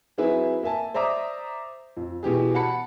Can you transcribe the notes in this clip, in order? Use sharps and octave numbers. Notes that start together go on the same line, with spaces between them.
F#3 C4 E4 G#4 B4
A#3 E5 G#5 A5
C5 D5 E5 A#5 D6 D#6
F2
B2 E3 G4 G#4
F#5 A5 B5 C#7